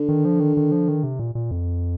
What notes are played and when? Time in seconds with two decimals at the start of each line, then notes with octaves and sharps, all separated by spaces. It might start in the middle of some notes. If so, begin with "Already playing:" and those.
Already playing: D3
0.09 D#3
0.25 F3
0.40 D#3
0.57 D#3
0.72 F3
0.88 D#3
1.03 C3
1.19 A#2
1.35 A#2
1.51 F2